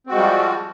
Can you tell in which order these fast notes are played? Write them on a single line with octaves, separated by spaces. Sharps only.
C4 F#4 G#3 F3 G3